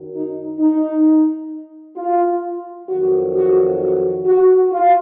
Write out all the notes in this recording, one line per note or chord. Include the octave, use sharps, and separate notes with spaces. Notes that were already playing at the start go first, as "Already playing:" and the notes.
Already playing: F#2 D#3 F#3
D#4
D#4
F4
F2 D#3 F#3 F#4
F#4
F#4
F#4
F4